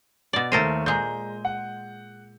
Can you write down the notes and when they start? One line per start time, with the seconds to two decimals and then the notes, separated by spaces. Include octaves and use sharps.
0.33 B2 D5
0.52 D#2 A3 A4 A#4 C5 D#7
0.86 A#2 G#3 A#5 G6
1.45 F#5